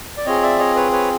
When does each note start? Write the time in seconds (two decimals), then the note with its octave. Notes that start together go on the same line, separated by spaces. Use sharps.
0.17 D5
0.26 C4 F4 G#4 C#5 D#5
0.42 D5 E5
0.59 C#5 D#5
0.76 B4 C#5
0.92 B4 C#5